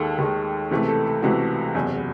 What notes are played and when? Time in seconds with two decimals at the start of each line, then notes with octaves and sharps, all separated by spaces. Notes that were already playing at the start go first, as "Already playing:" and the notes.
Already playing: D#2 D#3 G#3 A4
0.18 D#2 D#3 G#3
0.71 C#2 C3 E3 A3
0.88 A4
1.06 A4
1.22 C#2 C3 E3 A3 F#4
1.75 F#1 E2 C3